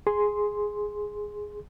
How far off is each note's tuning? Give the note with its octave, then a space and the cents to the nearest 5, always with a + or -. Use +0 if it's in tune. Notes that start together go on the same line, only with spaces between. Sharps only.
G#4 +0 C6 +0